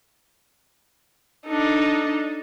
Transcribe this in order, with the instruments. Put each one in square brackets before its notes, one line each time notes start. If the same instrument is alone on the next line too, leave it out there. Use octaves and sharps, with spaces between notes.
[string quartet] D4 D#4 A4